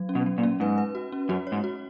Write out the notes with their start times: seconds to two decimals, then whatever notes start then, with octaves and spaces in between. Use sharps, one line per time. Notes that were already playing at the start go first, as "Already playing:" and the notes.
Already playing: F#3
0.09 C#4
0.15 B2
0.26 F#3
0.38 A#2
0.43 C#4
0.60 G#2 B4
0.78 B4
0.95 F#4
1.12 C#4
1.29 F#2 F#4
1.47 C#5
1.52 G#2
1.64 F#4